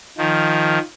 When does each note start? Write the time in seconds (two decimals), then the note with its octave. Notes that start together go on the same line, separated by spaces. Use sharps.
0.18 D#3 F3